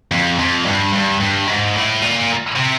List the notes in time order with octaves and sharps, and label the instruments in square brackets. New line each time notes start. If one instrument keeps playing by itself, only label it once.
[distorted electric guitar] F2
F2
G2
G2
G2
G#2
A2
A#2
C3